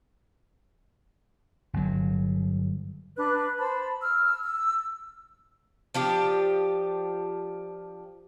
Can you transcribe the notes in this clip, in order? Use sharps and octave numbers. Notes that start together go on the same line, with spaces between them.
G1 F#3
D4 B4 F#6
C5 A5 B5
E6 F6
E6
F3 D4 G4